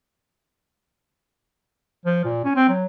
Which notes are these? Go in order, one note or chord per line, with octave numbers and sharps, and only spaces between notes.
F3
A#2
C#4
C4
F#3